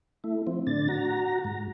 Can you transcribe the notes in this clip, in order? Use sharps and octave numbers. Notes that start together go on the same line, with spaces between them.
A3 E4
F3 C4
A2 D3 D4 A6
F#4 A#5
G#2